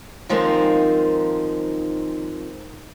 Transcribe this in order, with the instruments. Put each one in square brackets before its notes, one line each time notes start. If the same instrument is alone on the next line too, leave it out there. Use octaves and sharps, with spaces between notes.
[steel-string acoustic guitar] D#3 F3 G#3 A#3 C4 D#4